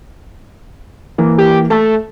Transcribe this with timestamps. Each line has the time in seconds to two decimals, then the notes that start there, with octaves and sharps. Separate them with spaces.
1.18 E3 A#3
1.38 G4
1.70 A3 A5